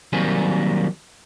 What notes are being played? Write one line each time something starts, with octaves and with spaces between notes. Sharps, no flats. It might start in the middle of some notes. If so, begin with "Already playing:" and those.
D#3 F#3 G3 A#3 C4 G#4